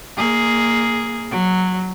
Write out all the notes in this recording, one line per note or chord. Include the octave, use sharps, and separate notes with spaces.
A#3 G#4
F#3